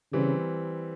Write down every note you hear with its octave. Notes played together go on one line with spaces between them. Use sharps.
C#3 E3 G3 C4